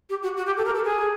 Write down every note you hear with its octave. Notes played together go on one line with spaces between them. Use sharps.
G4
F#4
F#4
G4
A4
A#4
A4
G#4